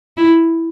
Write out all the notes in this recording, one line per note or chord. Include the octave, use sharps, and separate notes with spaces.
E4